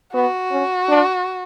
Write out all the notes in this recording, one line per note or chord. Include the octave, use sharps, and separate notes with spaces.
B3 F#4
C#4
D4